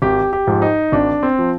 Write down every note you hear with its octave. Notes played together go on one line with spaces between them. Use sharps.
G#1 G4
G4
G#2 F3
D#4
G#1 D4
C4
F3